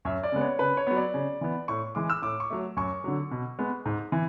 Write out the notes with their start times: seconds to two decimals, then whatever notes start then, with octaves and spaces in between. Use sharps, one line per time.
0.05 F#2 E5
0.23 D5
0.32 C#3 G#3 B3
0.41 C#5
0.59 C#3 B4
0.77 C#5
0.87 F#3 B3
0.96 D5
1.14 C#3
1.41 E3 B3
1.68 A2 C#6
1.95 E3 G#3 D6
2.10 E6
2.22 A2 D6
2.40 C#6
2.50 F#3 A3
2.77 F#2 C#6
3.04 D3 F#3
3.31 B2
3.59 G#3 B3
3.85 G#2
4.12 E3